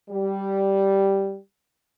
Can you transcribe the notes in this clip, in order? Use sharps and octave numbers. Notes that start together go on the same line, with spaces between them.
G3 G4